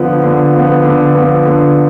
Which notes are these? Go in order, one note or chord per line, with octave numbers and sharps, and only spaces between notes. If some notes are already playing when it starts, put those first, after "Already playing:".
Already playing: D3 F3 B3
D3
F3
B3
D3
F3 B3
D3